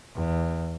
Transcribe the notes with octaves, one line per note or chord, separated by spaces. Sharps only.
E2